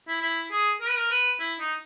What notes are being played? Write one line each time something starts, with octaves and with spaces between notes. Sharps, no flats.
E4
E4
G#4
A#4
B4
A#4
B4
E4
D#4